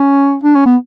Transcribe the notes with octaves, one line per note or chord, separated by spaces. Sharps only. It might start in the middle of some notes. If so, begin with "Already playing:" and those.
Already playing: C#4
D4
C#4
B3